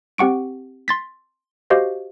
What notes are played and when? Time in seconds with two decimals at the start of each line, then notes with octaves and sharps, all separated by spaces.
0.18 C4 G4 F#5 C#6 D7
0.88 C6 A6 B6
1.70 F#4 G4 C5 D#5 F5